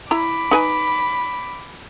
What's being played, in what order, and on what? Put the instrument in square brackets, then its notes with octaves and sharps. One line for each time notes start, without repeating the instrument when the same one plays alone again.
[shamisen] E4 A#5 [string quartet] B5 D6
[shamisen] D#4 B4 G#5